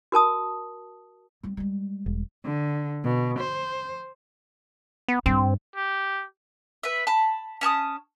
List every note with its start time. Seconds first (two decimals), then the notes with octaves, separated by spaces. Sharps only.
0.12 F#4 A#4 A5 D#6
1.43 G3 C4
1.57 G3 G#3
2.06 E1
2.44 D3
3.04 B2
3.40 C5
5.08 B3
5.26 G2 C4
5.76 G4
6.83 B4 E5
7.07 A5 B5
7.61 C#4 A5 C#6 D#6